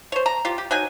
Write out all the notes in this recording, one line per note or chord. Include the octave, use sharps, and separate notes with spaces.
C5 C#5
A#5
F4 G4
G4
F#3 D#4 G#5